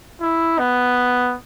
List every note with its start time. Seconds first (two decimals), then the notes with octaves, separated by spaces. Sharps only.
0.21 E4
0.59 B3